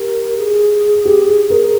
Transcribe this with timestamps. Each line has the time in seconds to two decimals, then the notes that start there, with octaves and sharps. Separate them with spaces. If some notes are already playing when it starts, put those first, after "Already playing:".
Already playing: G4 A#4
0.37 G#4
1.05 G4
1.50 A#4